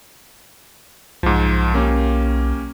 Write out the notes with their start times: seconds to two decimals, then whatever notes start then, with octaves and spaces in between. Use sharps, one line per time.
1.23 B1 G#2 F3
1.74 A#3 C#4 G4